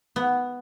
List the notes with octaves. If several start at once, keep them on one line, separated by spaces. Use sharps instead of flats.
B3